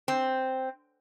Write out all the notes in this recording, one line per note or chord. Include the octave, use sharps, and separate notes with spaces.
C4